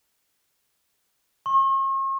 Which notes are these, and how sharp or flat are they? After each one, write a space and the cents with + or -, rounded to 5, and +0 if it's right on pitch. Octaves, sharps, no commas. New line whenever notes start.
C#6 -45